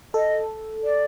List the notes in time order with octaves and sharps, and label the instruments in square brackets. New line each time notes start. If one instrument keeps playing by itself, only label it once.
[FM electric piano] A4 [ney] D#5
[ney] D5